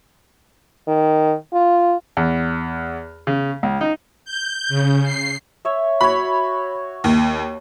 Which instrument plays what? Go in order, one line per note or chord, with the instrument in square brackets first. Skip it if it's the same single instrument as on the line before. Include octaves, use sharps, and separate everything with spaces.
[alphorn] D#3
F4
[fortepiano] E2
C#3
C#2
D#4
[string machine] G6
C#3
C7
[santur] C#5 E5
[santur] F#4 C#5 [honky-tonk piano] B5
[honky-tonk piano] D#2